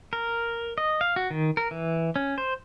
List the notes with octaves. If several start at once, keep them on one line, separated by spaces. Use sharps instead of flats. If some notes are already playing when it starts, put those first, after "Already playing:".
A#4
D#5
F5
F#4
D#3
A#4
E3
C#4
C5